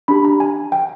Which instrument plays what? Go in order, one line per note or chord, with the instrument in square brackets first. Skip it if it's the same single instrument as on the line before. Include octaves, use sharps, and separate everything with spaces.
[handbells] D4 G4 B5
A#5
G#5
G5